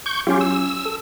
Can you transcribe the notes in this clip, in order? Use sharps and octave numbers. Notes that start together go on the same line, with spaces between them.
C#6 G6
F#3 C#4 F4 G4 G#5
E6
A4